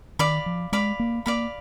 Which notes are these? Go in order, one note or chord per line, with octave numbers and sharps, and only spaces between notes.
D#3 D5 F5 B5
F3
G#3 D5 F5 B5
A#3
A#3 D5 F5 B5